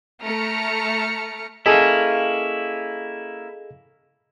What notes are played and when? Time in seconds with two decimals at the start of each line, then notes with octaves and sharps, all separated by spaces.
0.23 A3 A5 A#5 F6 C#7
1.66 A#3 C#4 E4 G#4 A4 D#5